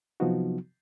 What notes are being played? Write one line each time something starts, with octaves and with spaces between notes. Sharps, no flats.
C3 F3 F#3 B3 D#4 F#4